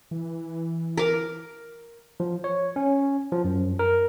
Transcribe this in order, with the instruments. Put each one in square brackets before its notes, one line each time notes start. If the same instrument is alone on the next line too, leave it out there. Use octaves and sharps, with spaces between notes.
[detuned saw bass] E3
[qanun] A#4 D6
[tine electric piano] F3
C#5
C#4
F3
F#2
A#4